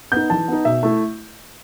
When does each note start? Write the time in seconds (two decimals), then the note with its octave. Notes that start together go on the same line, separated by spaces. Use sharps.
0.12 B3 D#4 G6
0.30 E3 A5
0.48 B3 D#4
0.65 B2 E5
0.83 A3 E4